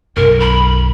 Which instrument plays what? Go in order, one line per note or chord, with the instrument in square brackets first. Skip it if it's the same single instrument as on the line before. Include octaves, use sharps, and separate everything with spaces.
[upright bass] B1 F#2 [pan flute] A#4
[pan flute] B5